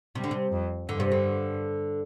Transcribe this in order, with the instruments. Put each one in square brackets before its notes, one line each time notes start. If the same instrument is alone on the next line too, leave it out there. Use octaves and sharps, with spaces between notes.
[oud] C3 [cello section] G3
[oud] D3
C3
[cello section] F2
[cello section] G2 [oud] D3
[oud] C3
D3